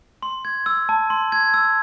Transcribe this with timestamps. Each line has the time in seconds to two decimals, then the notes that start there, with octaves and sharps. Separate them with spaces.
0.23 C6
0.45 G#6
0.66 E6
0.89 A5
1.10 C6
1.32 G#6
1.54 E6